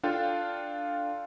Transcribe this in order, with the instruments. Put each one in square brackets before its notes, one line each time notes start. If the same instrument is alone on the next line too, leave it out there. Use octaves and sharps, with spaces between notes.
[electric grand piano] D4 F4 A4 F5 G5